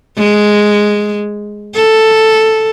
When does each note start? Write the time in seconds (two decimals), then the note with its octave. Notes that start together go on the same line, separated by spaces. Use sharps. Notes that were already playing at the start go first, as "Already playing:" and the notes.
0.18 G#3
1.75 A4